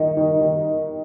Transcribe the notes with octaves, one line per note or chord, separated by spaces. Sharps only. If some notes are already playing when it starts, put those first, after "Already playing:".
Already playing: D#3 D#4
D#3
D#3